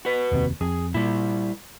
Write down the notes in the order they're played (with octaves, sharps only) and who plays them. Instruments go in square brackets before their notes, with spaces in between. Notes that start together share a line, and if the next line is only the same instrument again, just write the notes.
[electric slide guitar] F#4 B4
[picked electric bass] F1 D#2 C3
[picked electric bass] F2 [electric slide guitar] G#4
[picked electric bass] A#2 [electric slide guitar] G3 E4